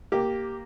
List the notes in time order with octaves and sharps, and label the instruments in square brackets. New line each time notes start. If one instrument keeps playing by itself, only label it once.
[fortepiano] A#3 G4